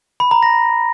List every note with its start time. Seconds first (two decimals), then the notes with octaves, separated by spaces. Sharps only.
0.20 B5
0.31 A#5
0.43 A#6